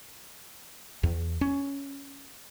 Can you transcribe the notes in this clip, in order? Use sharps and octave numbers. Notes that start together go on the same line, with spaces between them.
E2
C#4